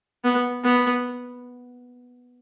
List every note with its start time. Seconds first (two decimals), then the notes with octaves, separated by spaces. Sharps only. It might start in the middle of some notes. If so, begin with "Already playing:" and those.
0.24 B3
0.64 B3